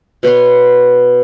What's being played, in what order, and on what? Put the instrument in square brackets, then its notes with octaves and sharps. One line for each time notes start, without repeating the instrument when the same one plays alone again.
[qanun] B2 B3 C#5 C6